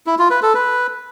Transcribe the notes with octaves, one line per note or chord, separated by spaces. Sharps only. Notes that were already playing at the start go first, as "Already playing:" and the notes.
E4
F4
B4
A4
B4